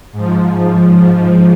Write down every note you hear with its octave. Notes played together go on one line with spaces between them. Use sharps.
G#2 F3